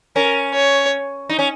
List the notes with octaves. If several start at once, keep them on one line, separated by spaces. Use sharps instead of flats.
C#4 A#4
C#5
D#4
C#4